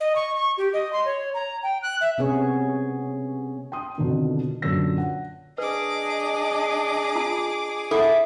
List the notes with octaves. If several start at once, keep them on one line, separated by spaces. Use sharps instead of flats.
D#5
C#6
C#6
G4
D#5
C6
C#5
A#5
G5
F#6
E5
C3 B3 C#4 G#4 C#5
G5 C6 D#6
F2 B2 D3 D#3
F#2 A#2 D3 C#5 E6 A#6
F#5
D4 G#4 B4 D#5 D6
F4 A5
E4 A4 F#5 B5